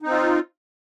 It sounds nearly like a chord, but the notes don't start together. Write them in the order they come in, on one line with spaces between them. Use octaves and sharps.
D#4 C4 F4